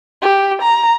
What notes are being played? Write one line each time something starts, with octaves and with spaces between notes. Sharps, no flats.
G4
A#5